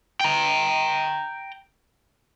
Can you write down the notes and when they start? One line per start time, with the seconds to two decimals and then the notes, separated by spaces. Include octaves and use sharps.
0.21 G5 A#5